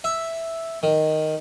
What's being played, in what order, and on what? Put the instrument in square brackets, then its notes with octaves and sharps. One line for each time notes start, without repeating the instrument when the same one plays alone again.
[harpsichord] E5
D#3